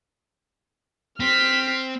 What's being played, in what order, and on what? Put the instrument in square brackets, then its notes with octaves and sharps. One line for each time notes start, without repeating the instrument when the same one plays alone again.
[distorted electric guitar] C4 [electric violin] F6 B6